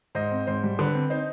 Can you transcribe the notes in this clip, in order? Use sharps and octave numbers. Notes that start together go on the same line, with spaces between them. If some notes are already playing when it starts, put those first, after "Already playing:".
G#2 C5 D#5
C4
G#2 C5
G3
D3 B4
C4
D#4 C5